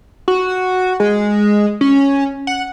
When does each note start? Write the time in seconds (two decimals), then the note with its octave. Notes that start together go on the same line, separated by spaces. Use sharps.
0.28 F#4
1.00 G#3
1.81 C#4
2.47 F#5